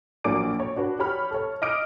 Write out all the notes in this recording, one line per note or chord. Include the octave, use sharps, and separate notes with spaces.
A#1 F#3 A#3 D5 D6 D7
C#5
D4 F#4 B4
G4 C#5 B5 F6
A4 C#5
D#5 D6 F6 D7